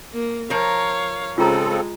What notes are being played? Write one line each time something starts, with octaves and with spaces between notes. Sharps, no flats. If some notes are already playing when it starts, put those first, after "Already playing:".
A#3
F3 A#4 C#5 F5
C#3 G#3 C4 F4 A4 A#5